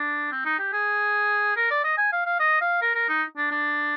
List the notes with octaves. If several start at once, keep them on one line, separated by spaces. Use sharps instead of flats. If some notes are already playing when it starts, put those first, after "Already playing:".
Already playing: D4
C4
D#4
G4
G#4
A#4
D5
D#5
G#5
F5
F5
D#5
F5
A#4
A#4
D#4
D4
D4